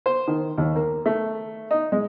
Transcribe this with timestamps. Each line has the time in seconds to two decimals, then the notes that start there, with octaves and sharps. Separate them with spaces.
0.06 C5
0.28 D#3
0.58 D#2
0.76 A#3
1.06 A3
1.71 D#4
1.92 G#3